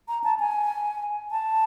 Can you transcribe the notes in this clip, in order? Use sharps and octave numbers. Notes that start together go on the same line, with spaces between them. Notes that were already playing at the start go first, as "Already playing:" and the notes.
A#5
A5
G#5
A5